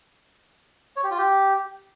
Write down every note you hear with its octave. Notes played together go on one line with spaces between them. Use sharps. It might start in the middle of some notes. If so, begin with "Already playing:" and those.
C#5
G4
F4
G4